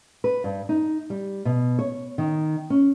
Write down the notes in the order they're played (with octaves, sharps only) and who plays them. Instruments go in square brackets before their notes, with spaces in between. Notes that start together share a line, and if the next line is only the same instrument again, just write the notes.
[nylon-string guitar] B4
G2
D#4
G3
B2
C#5
D#3
C#4